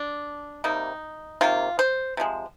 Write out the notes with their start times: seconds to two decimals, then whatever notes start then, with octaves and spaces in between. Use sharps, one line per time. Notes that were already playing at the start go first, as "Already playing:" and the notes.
Already playing: D4
0.64 C3 G3 A#3 D#4
1.41 C3 D#3 A#3 F4
1.79 C5
2.17 C3 F3 G#3